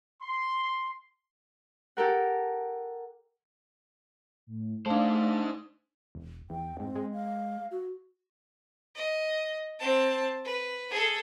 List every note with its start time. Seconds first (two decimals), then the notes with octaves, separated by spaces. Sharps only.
0.22 C6
1.97 G4 A4 A#4 F#5
4.47 A2
4.86 A3 D4 D#4 C5 F5
6.15 E1
6.50 E2 G5
6.80 G#2 C4
6.96 G#3
7.13 F5
7.71 F#4
8.96 D#5
9.79 C4 A5
10.45 B4
10.90 G#4 A4